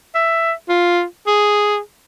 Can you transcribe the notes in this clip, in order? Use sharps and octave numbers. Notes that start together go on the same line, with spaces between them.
E5
F4
G#4